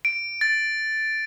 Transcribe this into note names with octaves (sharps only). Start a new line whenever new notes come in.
D7
A6